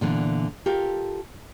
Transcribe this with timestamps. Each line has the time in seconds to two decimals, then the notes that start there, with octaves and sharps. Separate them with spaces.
0.01 A#2 D3 E3 B3
0.66 F4 G4 A4 A#4